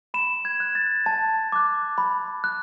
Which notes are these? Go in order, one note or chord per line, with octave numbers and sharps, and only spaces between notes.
B5 E7
G#6
F#6
A6
A5
D6 F#6
B5
F#6